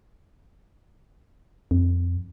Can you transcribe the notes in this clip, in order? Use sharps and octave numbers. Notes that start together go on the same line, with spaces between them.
F2